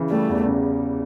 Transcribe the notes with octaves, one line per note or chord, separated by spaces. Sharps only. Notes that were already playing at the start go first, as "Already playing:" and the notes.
Already playing: C#3 E3
G3 A3
E2
C#3